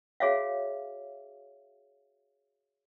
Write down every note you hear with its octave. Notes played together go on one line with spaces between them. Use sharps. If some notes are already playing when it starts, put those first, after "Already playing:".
F#4 G#4 C#5 E5 F5